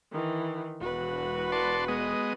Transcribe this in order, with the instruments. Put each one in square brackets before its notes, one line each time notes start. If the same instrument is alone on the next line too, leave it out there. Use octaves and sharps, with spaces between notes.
[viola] D#3 E3
[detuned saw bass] E1 [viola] F#4 B4
[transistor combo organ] D5 A5 C6
G#3 B3 D#5